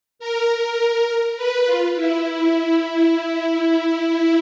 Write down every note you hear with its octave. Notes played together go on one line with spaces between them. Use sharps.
A#4
A#4
B4
F4
E4